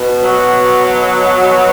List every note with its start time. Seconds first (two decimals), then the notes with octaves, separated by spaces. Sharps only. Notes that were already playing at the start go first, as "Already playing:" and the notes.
Already playing: B2
0.23 F#3